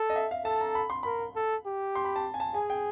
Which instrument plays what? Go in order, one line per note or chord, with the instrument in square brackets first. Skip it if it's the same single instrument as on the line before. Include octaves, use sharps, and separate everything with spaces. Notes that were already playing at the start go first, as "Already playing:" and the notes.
Already playing: [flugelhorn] A4
[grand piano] D#5
E5
F5
[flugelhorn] A4 [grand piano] A5
[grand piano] A#5
B5
C6
[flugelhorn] A#4 [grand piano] B5
[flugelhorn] A4
G4
[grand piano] C6
B5
A5
G#5
A5
[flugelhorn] G#4 [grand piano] G#5
[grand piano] G5